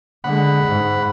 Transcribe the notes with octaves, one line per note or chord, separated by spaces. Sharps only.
D3 G#3 F#5 B5
G#2